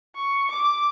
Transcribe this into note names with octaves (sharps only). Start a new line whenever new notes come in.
C#6
D6